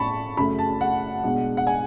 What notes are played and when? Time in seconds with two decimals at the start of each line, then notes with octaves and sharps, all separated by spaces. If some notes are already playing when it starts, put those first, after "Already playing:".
Already playing: A2 C#4 A5 B5 C#6
0.37 F#2 C#3 F#3 A3 B5
0.59 A5
0.81 F#5
1.24 B2 G#3 D4
1.57 F#5
1.67 G#5